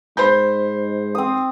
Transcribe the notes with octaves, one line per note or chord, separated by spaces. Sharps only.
G#2 C5 B5 G6
C4 D#6